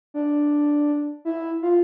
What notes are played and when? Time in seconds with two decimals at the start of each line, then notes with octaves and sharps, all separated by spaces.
0.14 D4
1.25 E4
1.62 F4